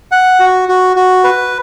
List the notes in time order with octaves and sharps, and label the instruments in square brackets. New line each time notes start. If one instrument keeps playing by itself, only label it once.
[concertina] F#5
F#4
F#4
F#4
B4